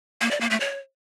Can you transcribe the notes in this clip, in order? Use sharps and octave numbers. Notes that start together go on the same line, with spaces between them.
A#3
D5
A#3
A3
C#5